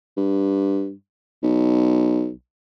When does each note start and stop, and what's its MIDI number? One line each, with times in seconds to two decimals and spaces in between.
0.17 0.93 43
1.43 2.31 35